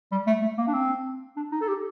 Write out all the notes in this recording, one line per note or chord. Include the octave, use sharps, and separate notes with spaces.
G3
A3
A3
A#3
D4
C4
D4
D#4
A4
G4